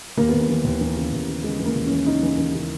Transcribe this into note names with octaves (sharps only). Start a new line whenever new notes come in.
D#2 A#3
D#2 B3
A#3
E3
D#2
E3
C#3
D#2
C#3
C#3 G#3
E3
A#3
D#2
C#4
E3
C#3 D#4
E3
E3
C#3